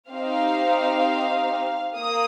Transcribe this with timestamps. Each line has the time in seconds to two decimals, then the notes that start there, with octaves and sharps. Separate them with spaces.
0.11 C4 D#4 G4 F5
1.97 A#3 D#6